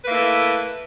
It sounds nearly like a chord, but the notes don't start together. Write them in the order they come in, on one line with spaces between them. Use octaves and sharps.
B4 A#3 E4 A3